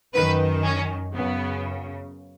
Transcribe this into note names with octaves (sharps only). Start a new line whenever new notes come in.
F#2 D#3 B4
C#4
F#2 C#3 B3